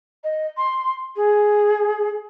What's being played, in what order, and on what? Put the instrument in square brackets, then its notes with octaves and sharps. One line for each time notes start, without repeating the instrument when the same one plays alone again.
[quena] D#5
C6
G#4